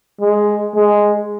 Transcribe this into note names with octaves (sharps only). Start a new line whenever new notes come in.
G#3
G#3